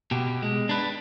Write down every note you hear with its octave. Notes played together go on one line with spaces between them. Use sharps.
B2 G4
G#3
D4 B4